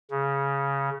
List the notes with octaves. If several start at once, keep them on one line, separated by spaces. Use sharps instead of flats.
C#3